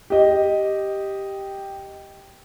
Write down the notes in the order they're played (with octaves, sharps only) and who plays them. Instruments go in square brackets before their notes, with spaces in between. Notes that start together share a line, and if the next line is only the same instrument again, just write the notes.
[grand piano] G4 D#5